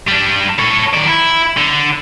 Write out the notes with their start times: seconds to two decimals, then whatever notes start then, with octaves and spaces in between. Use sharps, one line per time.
0.08 G3 D4
0.59 A4 C#5
0.94 D#3 D5
1.08 E4
1.57 D3